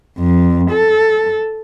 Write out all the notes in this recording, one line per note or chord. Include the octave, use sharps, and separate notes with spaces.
F2
A4